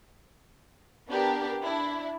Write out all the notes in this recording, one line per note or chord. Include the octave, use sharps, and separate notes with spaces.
B3 D4 G4 A#4
D4 E4